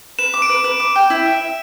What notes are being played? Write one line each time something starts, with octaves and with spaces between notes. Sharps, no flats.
B4 E7
D6
D7
B4
B4
D6
G5
E4
E5
E5